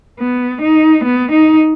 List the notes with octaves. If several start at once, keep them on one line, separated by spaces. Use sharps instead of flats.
B3
D#4
B3
D#4